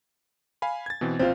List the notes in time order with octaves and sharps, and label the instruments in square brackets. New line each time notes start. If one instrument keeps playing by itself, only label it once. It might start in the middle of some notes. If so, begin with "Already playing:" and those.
[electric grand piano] F5 G#5 B5
G#6 A6
B2 E3 C4
[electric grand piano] A#1 [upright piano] C4 F4